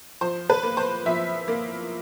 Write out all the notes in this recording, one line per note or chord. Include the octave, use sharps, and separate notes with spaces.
F3 C5
B4
A#3
C5
F3 E5
A#3